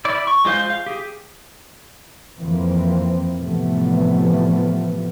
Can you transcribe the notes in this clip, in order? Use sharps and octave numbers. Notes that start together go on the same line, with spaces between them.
E4 D5
C#6
G#3 F4 C5 F5 G6
F5
G4 G#4
F2 E3 A#3 C4
A2 C3 E3 F3 A3 B3